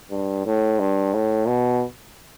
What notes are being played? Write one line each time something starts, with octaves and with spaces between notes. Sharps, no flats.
G2
A2
G2
A2
B2